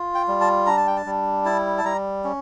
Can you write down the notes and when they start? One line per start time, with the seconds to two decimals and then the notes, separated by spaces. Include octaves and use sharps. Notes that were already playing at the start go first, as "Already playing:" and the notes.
Already playing: F4
0.15 G5
0.28 G3
0.41 A5
0.66 D4 A#5
0.77 A5
0.87 G5
0.96 A5
1.06 G3
1.45 E4 A5
1.78 A5
1.84 G3 A#5
2.24 C#4